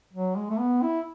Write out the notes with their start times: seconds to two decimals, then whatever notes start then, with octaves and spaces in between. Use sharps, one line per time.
0.13 F#3
0.36 G#3
0.50 A3
0.59 B3
0.82 E4